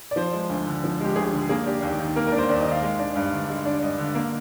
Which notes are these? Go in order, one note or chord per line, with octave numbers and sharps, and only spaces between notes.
D5
F3 C5
G#3
D2
D3
F3
G#3 G4
D2 G#4
D3
A#3 G#4
D4 G4
D#2
D#3
A#3 A#4
D4 A#4
C5
D#2 D5
D#5
D#3
F5
G#3 F5
D4
G2
D3
G#3
D4
G2 D#5
D3
A#3